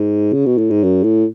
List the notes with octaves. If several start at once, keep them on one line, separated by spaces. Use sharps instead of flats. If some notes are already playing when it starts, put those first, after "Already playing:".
Already playing: G#2
C#3
B2
A2
G#2
F#2
A2